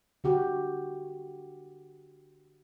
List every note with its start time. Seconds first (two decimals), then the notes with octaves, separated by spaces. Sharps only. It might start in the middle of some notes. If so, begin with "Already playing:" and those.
0.24 D3 F#4 G4